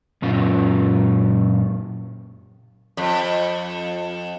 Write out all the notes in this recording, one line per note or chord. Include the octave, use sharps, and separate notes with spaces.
F#2 A#2 C#4 F4
F2